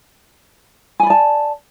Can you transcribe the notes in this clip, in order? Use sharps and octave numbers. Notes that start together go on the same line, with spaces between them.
D5 G#5 A5 B5